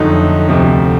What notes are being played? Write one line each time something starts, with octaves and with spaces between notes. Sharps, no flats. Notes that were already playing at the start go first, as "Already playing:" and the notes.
Already playing: F2 D3 F#3 A3 D#4
D2 C3 F3 A3